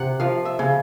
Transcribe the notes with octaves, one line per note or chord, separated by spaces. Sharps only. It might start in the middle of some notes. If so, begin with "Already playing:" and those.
Already playing: C3 F#5
F3 F5
E5
C#3